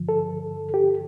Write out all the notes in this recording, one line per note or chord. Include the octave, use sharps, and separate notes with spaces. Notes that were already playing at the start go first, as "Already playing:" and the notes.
Already playing: G2 D3 F3
A4
G4